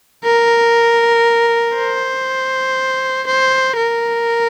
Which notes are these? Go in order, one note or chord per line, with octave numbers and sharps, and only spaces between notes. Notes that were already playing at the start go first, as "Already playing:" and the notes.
A#4
C5
C5
A#4